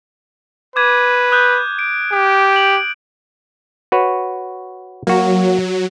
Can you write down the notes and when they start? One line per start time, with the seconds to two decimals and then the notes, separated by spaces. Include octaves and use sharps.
0.76 B4 D6 G#6 D#7
1.32 D#6 F#6 G6
1.79 D7
2.12 G4
2.53 D7 F#7
3.92 F#4 B4 C#5
5.07 F#3 A#3 F#4